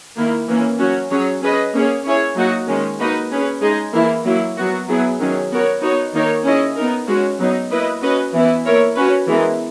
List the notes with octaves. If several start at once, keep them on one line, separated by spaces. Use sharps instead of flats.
D#3 A#3 E4
E3 A#3 C#4
F#3 C#4 F#4
F#3 C#4 G#4 C#5
C#4 G#4 B4 D#5
A#3 C#4 G#4 C#5
C#4 E4 G#4 C#5
F#3 A#3 D#4 F#4
D#3 G#3 C#4
A#3 D#4 F#4 B4 D#5
C#4 G#4 B4
G#3 D#4 G#4 D#5
E3 A#3 E4
F#3 A#3 E4
F#3 B3 F#4
F#3 B3 E4 G#4
D#3 F#3 C#4 G#4
B3 F#4 A#4 C#5
B3 D#4 F#4 C#5
D#3 A#3 D#4 A#4 C#5
C#4 E4 G#4 D#5
B3 D#4 A#4
G#3 C#4 F#4
F#3 B3 D#4
A#3 E4 B4 D#5
C#4 F#4 B4 D#5
E3 B3 E4 B4
A#3 E4 A#4 C#5
C#4 F#4 B4
E3 G#3 B3 E4 A#4